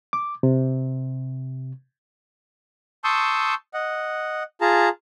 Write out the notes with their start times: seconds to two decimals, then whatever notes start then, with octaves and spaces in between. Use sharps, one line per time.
0.13 D6
0.43 C3
3.04 A5 C6 C#6 D#6 E6 G6
3.74 D#5 F#5
4.61 F4 G#4 A5 A#5